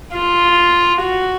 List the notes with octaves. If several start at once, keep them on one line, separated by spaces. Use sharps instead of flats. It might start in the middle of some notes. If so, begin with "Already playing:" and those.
F4
F#4